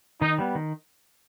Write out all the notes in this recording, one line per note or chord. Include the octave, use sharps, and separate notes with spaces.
D#3 D#4
G3 B3
D#3